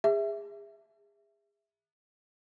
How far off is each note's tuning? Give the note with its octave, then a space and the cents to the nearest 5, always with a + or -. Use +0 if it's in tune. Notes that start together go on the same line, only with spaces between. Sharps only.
G#4 -35 E5 +0